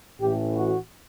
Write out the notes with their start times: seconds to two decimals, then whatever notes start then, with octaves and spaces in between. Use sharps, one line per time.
0.20 A1 A2 E3 G4
0.56 F#4